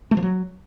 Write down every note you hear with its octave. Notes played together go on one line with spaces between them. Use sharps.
A3
F3
F#3